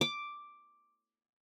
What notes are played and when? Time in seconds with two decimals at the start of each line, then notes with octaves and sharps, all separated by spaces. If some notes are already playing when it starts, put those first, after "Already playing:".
0.01 D6